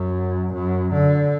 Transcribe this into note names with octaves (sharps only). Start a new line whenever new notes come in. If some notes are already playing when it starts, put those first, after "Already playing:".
Already playing: F#2
F#2
D3